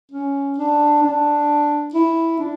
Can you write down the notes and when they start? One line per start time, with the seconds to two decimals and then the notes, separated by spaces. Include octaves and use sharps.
0.12 C#4
0.58 D4
1.03 D4
1.94 E4
2.40 D4